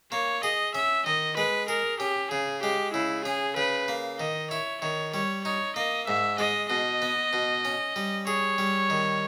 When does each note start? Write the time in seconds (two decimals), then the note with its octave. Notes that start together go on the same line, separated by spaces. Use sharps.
0.12 A#3 C#5
0.43 G#4 D#5
0.75 C#4 E5
1.06 D#3 D#5
1.37 G#3 B4
1.68 G#4 A#4
2.00 C#4 G4
2.31 C#3 G#4
2.63 G#3 G4
2.93 C#3 E4
3.25 C#4 G#4
3.57 C#3 B4
3.88 A#3
4.20 D#3 D#5
4.51 E4 C#5
4.82 D#3 C#5
5.14 G3 C#5
5.44 D#4 C#5
5.76 A#3 D#5
6.07 G#2 E5
6.38 G#3 D#5
6.70 B2 D#5
7.02 B3
7.33 B2
7.65 C#4
7.96 G3
8.27 G#4 C#5
8.58 G3
8.90 D#3